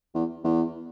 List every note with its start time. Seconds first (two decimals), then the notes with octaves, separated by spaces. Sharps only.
0.14 E2
0.44 E2